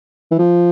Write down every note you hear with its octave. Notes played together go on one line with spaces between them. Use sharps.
E3
F3